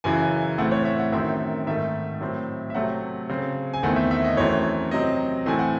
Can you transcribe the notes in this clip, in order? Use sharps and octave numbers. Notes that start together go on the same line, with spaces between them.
F#2 C#3 E3 G#5
A2 E3 A3 C4 F#5
C#5
E5
F#5
F#2 D#3 A3 C4 E5
G#2 D#3 A3 E5
A2 F#3 C4
E5
C3 F#3 A3 C4 F#5
C#3 F#3 C4
G#5
E2 D#3 A3 C4 F#5
E5
E5
D#5
F#2 E3 A3 C4 C#5
C3 F#3 C4 D#5
A2 E3 A3 C4 G#5
F#5